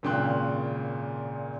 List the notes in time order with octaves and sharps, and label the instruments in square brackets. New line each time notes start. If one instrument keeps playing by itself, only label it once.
[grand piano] G#1 A#2 C#3 G5 C6 F#6